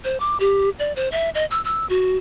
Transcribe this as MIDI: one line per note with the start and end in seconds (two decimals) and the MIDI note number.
0.05 0.19 72
0.20 0.37 86
0.40 0.69 67
0.79 0.93 74
0.96 1.11 72
1.12 1.30 76
1.35 1.45 75
1.51 1.61 88
1.64 1.86 88
1.89 2.18 66